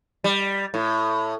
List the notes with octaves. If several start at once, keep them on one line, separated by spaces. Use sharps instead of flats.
G3
A2